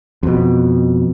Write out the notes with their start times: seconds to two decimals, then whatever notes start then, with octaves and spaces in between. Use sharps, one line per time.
0.23 F2 B2